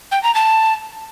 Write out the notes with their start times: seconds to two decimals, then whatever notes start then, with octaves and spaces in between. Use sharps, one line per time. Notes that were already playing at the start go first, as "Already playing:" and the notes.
0.12 G5
0.23 A#5
0.35 A5